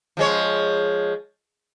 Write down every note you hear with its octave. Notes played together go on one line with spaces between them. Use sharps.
F3 G#3 C#5